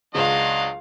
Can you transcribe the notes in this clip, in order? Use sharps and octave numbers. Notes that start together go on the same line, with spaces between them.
C#2 C#3 F#3 D4 D#5 F5